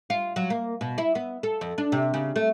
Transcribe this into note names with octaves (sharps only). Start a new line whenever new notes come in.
F4
F#3
A#3
B2
E4
B3
A4
F2
D4
C3
C#3
A3